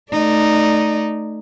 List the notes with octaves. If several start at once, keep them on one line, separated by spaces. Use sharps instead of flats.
A3 D#4 D5